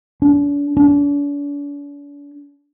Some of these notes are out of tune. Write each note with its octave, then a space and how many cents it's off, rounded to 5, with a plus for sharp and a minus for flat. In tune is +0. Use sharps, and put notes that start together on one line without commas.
D4 -40
D4 -45